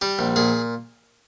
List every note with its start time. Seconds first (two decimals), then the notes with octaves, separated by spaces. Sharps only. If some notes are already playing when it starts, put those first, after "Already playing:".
0.01 G3 G4
0.19 A#1
0.36 A#2 G#4